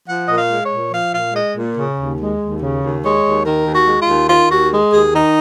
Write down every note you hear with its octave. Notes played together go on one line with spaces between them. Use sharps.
F3 F#5
A#2 D#5
F5
G#3
C#5
A#2
F3 F5
A#2 F5
G#3 D#5
A#2
C#3
D#2
G#3
D#2
C#3
D#2
G#3 C#5
D#2
D#3 A#4
D#2
F#4
G#3
F4
D#2
D#3 F4
D#2 F#4
G#3
D#2 G#4
D#3 D#4